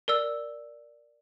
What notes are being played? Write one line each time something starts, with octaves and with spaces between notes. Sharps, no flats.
A#4 D5 E6